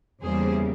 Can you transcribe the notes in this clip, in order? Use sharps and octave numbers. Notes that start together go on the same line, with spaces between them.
E2 C#3 E3 G3 A#3 G#4 C5